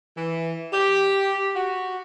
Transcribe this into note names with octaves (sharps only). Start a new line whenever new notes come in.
E3
G4
F#4